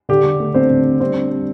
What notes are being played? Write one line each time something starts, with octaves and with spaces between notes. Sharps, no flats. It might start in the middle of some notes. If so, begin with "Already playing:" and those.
D3 G4
D3
A3
C4 D4 C5
D3
D4
G3 C4 C5
D4
G3